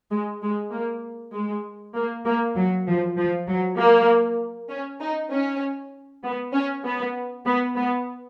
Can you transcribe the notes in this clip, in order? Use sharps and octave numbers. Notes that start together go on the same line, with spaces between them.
G#3
G#3
A#3
G#3
A#3
A#3
F#3
F3
F3
F#3
A#3
C#4
D#4
C#4
B3
C#4
B3
B3
B3